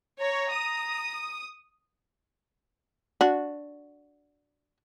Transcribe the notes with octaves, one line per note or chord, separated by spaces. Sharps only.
C#5 A#5
D#6
D4 F#4